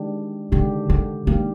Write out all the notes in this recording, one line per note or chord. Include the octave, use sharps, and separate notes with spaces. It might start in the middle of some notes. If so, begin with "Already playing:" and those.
Already playing: D#3 G#3 D4 G4
D3 D#3 G#3 D4 G4
D3
D#3 G#3 A#3 D4 G4